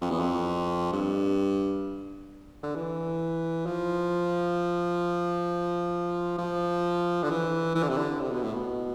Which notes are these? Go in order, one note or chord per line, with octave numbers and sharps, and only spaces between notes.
F2
E2
F2
G2
D3
E3
F3
F3
D3
E3
E3
D3
C3
D3
C3
B2
A2
B2